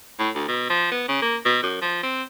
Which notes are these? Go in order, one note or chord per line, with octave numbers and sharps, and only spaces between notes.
A2
D2
B2
F3
B3
C#3
A#3
B2
F#2
F3
C4